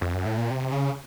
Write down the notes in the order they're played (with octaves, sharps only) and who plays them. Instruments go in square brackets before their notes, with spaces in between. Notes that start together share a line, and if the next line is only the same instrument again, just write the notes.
[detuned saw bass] F2
F#2
A2
A#2
C3
C#3